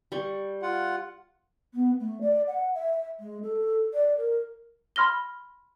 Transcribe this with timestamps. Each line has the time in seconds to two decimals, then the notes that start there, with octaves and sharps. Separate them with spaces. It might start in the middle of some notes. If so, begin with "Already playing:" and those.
0.12 G3 C#6
0.62 F4 F#5
1.74 B3
2.00 A3
2.21 D5
2.47 F#5
2.75 E5
3.20 G#3
3.43 A4
3.94 D5
4.18 A#4
4.96 B5 C6 F6 A#6 G7